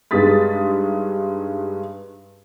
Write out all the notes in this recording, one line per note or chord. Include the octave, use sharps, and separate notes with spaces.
G2 G#3 D#4 D#6 A6 B6